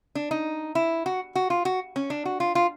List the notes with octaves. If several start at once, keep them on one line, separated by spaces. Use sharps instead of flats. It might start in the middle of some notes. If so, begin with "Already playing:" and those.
D4
D#4
E4
F#4
F#4
F4
F#4
C#4
D4
F#4
F4
F4